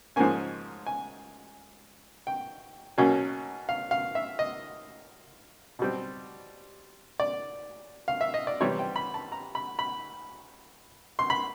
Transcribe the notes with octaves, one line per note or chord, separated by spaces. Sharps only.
G#2 F3 A#3 C#4 G#5
G#5
G5
B2 F#3 A#3 C#4
F5
F5
E5
D#5
B2 G3 C4
D5
F5
E5
D#5
D5
C3 E3 G3 C4 C#5
G5
B5
A5
A#5
B5
B5
C6
B5